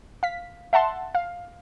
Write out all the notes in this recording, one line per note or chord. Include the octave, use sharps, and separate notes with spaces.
F5 B6
E5 F#5 A5 C6
F5